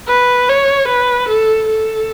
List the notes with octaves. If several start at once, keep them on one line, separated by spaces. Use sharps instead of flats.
B4
C#5
B4
A4
A4